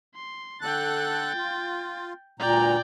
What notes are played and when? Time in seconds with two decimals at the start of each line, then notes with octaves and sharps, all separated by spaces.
0.15 C6
0.61 D3 A4 G5 F#6 A6
1.35 F4
2.39 D2 G2 A#2 D5 G5 A#5